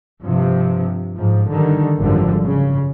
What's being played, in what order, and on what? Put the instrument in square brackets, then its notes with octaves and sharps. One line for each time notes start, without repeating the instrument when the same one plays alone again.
[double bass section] G2 C3 F3
G#2 F3
D3 D#3 G3
G#1 F#2 D3 F3 G3
C#3